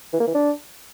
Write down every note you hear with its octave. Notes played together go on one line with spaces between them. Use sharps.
E3
A#3
E3
D4